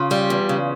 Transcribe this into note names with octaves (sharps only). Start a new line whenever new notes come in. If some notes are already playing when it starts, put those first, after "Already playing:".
Already playing: C#3 F4
G3
E2
C#3